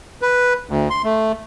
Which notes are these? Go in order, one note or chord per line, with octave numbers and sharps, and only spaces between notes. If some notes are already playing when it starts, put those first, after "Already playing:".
B4
D2
C6
A3